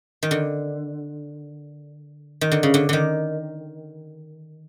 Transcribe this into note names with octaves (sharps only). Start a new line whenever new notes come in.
D#3
D3
D#3
D3
C#3
D3
D3 D#3